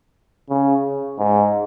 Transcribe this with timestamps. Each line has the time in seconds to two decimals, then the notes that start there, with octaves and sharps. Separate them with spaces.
0.50 C#3
1.18 G#2